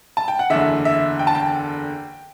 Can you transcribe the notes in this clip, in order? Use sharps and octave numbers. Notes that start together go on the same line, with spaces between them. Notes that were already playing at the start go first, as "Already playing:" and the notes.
A5
G5
F#5
F#1 E2 D3 E5
E5
G5
A5
G5